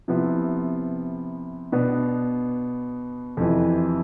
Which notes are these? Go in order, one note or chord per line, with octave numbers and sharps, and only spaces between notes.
C3 F3 B3 E4
B2 B3 D4
F2 C3 E3